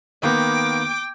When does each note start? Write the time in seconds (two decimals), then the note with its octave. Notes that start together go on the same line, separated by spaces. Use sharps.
0.23 D#3 A#3 B3 G5 D6